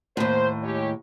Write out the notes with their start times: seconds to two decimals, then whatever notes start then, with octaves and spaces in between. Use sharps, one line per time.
0.17 D#2 A2 C5
0.63 G#3 G4 C#5